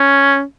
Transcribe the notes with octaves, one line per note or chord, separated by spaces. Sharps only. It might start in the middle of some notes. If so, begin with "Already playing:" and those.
Already playing: C#4